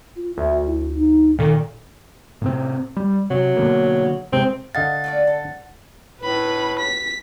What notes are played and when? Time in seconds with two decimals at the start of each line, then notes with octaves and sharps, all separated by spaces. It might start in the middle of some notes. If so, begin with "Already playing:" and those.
0.16 F4
0.38 D2 E5
0.67 E4
0.95 D#4
1.39 A#2 D#3 A4
2.42 A2 C3 C4
2.97 G3
3.30 C3 F#3
3.57 B2 D3 A#3
4.33 C3 G#3 C4
4.75 D3 D#5 F5 F#5 A6
5.04 A3 F4 D5
5.27 A4
6.21 A2 B4 B5
6.79 B6